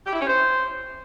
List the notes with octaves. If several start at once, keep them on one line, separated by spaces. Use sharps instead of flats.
G4
E4
C#4
C5